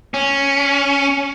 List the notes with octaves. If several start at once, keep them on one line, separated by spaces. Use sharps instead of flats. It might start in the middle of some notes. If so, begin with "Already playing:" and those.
C#4